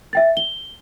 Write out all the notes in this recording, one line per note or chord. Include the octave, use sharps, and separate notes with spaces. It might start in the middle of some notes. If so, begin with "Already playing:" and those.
E5 G5 A6
G7